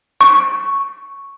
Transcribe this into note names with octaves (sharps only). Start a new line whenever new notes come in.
C#6